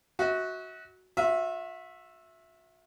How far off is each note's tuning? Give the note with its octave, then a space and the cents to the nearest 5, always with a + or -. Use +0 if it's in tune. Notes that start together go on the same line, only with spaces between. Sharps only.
F#4 +0 E5 -40
F#4 -45 E5 +0